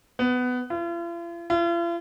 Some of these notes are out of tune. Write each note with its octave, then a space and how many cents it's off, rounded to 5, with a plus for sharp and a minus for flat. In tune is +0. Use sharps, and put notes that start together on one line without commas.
B3 +15
F4 -45
F4 -45